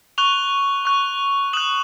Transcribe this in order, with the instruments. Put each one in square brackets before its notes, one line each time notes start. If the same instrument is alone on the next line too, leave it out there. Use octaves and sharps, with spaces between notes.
[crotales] C#6 F#6 F7 G7
C#6 F#6
D#6 F#6 E7 F#7